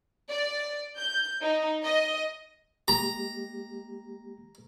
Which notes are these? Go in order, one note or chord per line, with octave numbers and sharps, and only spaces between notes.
D5
G6
D#4
D#5
G#3 A#3 G4 A#5